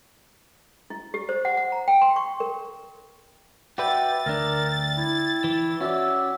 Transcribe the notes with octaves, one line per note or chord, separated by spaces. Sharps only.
E4
G4
C5
F#5
F#5
A#5
G5
C6
C#6
A#4
F#4 B4 D5 E5 G5 A6
D2 D4 A#4
E4
E3
C#4 F#4 D5 E5